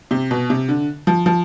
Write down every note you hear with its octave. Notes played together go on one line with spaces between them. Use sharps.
C3
B2
C3
D3
F3
F3